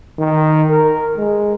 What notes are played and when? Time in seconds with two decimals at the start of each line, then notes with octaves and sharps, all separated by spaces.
0.18 D#3
0.71 A#4
1.18 G#3